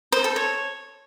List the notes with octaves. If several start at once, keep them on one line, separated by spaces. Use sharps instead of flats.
C5
A4
C#5